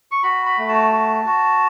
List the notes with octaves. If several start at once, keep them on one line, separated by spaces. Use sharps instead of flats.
C#6
F#4 B5
B5
A3
A5
F#4
F#4